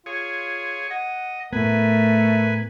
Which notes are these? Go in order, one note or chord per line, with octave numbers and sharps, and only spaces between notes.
F4 G#4 C#5
D#5 F#5
A2 A3 B3 A#4 B4 G#5